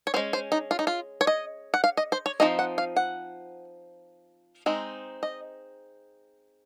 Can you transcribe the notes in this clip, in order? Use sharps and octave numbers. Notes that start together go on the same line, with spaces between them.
C#5
G#3 C#4 C5
C5
D#4
F4
D#4
F4
C#5
D#5
F#5
F5
D#5
C5
C#5
F3 C4 D#4 D#5
F#5
F5
F#5
G#3 C4 D#4
D#5